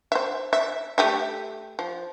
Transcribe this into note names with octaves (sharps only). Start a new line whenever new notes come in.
C5 E5
E5
A3 G4 E5
F3